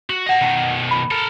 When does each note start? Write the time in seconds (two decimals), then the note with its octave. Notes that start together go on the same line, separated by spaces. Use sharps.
0.10 F#4
0.26 D#5 F#5 A5 A#6
0.41 B2 D#3
0.91 B5
1.11 A4 A#4